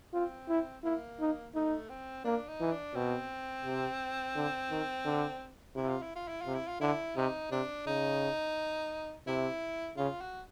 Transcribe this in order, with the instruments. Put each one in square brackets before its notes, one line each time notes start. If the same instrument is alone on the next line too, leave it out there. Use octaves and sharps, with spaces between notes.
[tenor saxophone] C4 [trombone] F4
[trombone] E4
[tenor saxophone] A#3 [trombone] E4
[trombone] D#4
[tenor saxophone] A3 [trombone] D#4
[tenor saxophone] C4
[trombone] A#3 [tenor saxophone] D4
[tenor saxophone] D#4
[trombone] E3
[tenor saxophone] D4
[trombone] B2 [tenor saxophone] C4
[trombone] C3
D3
D#3
D3
[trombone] C3 [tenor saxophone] E4
[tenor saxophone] F4
E4
F4
E4
F4
[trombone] C3
[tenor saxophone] E4
F4
[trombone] D3 [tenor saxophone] E4
[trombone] C3 [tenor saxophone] D#4
[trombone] C3 [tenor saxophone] D4
[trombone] C#3 [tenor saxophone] D#4
[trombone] C3 [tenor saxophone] E4
[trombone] C#3 [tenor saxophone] F4
[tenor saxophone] F#4